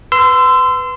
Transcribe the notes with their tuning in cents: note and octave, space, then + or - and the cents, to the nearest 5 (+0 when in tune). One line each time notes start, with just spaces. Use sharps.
B4 +0 C6 -25 E6 +15